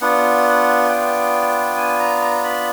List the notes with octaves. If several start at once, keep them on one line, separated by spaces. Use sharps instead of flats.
B3 D4 F4 F#5
G5
G#5
A#5
A#5
B5